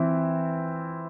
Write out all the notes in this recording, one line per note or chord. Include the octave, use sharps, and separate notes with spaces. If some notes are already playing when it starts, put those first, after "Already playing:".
Already playing: E3 C4 E4